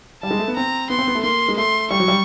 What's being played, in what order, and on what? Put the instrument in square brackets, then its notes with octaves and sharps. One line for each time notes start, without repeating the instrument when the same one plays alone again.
[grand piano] G3 [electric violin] A5
[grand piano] G#3
A3
B3
[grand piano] C4 [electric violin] A#5
[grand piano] B3 [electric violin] C6
[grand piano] C4
B3
A3
[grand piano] A#3 [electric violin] C6
[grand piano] G#3
[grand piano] A3 [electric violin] C6
[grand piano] G3 [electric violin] C#6
[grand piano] F#3
G3